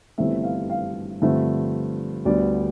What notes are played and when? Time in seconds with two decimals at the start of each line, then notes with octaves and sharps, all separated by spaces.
0.18 G1 G2 E3 A3 C4 E5
0.43 F5
0.70 F5
1.22 G2 D3 F3 A3 C4 E5
2.25 D2 D3 G3 B3 D5